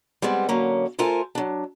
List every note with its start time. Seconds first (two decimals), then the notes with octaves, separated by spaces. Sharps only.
0.22 G3 G#3 B3 C4
0.49 D3 F#3 A#3 C#4
0.99 A3 F4 A4 A#4 C5 G#5
1.35 F#3 D4